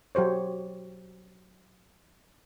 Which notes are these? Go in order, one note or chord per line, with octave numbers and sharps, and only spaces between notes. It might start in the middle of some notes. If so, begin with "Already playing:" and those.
F#3 G4 C5 C#5